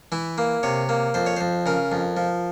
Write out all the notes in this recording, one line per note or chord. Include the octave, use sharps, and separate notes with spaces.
E3 E4
A#3
C3 C#5
A#3
F2 C5
C#5
F2 C5
C#3 A#4
F2
F3